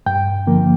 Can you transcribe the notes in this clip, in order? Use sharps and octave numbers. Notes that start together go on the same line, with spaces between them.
G2 G5
D3 F3 A#3